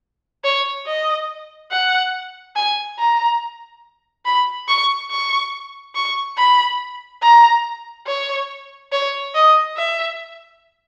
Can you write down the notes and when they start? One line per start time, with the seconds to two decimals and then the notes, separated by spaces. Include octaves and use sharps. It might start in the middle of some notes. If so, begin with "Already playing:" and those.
0.44 C#5
0.86 D#5
1.71 F#5
2.56 G#5
2.99 A#5
4.25 B5
4.68 C#6
5.10 C#6
5.95 C#6
6.37 B5
7.22 A#5
8.07 C#5
8.92 C#5
9.34 D#5
9.76 E5